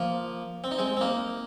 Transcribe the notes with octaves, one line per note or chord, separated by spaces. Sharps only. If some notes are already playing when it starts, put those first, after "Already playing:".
Already playing: F3 A#3
C4
D#4
G#3 C4
C4
A#3 D#4